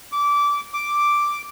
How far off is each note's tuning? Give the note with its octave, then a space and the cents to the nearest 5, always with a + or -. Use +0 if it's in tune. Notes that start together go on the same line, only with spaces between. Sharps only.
D6 -20
D6 +0